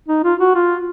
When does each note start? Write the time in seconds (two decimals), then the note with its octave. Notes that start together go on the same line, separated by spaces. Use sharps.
0.08 D#4
0.24 F4
0.40 F#4
0.55 F4